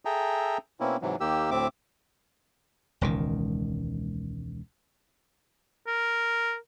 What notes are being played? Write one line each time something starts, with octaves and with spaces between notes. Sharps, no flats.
G#4 A4 E5 G5 A#5
B2 A#3 C4 C#4 E4
G#2 C3 E3 F#3
D#2 D#3 A#3 G4 E6
D2 A2 C4 E5 D6
E1 C#2 D#3
A#4